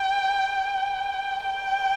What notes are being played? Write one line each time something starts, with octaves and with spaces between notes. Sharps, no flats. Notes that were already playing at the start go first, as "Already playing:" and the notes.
Already playing: G5
G5